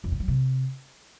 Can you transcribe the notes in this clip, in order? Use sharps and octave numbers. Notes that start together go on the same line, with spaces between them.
F2
D3
F#3
C3